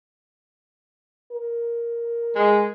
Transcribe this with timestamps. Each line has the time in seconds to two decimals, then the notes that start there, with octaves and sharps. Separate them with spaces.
1.32 A#4
2.36 G#3